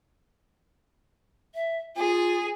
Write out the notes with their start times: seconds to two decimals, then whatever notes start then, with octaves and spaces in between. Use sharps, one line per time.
1.54 E5
1.96 F4 G#4